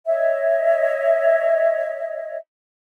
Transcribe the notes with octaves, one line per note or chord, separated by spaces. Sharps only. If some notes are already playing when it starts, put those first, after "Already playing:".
C#5 D#5 E5